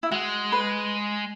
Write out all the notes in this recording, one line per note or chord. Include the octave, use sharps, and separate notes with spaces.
E4
G#3 F#4
B4